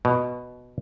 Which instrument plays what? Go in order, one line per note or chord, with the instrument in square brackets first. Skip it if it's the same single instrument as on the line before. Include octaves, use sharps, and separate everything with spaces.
[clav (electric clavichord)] B2